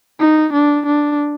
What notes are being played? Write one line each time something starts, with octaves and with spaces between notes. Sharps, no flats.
D#4
D4
D4